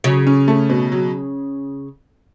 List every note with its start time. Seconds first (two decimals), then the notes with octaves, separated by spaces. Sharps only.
0.04 C#3 F#3
0.27 C#4
0.48 A3
0.70 B2
0.92 F#3